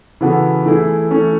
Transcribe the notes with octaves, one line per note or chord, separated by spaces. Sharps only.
C#3 E3 B3 F#4 A4
E3 A3 E4 G#4
E3 A3 C#4